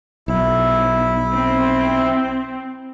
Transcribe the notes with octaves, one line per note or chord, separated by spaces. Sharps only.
B1 E4
C4